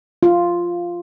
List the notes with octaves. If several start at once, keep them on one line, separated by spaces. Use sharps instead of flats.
F4